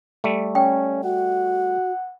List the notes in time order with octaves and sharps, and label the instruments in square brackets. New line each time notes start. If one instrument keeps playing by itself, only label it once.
[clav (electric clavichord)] G3 A3
[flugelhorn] C#4 [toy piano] G5
[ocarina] F#4 [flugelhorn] F#5